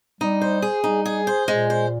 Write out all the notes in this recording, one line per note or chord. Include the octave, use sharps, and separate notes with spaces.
G3 D#4
C5
G#4
G3 D#4
G#4
C5
A#2 G#3
C5